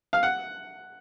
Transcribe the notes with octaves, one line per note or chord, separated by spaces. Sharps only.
F5
F#5